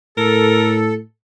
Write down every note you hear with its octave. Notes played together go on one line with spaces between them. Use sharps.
A2 A4 A#4